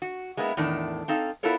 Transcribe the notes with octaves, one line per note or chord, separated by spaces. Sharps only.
F#4
G#3 A#3 B3 D#4 E4
E2 A2 D#3 D4
C4 D#4 A4 F5
B3 E4 F4 A4 A#4 C#5